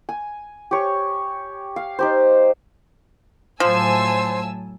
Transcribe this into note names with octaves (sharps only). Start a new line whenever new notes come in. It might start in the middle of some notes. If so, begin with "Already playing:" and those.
G#5
G4 C#5
F5
D#4 G4 C5
A2 F3 F#3 C5 G#5 A5 E6